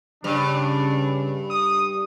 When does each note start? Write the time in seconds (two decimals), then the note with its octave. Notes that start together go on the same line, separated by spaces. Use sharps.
0.24 G2 C#3 D4
1.50 D#6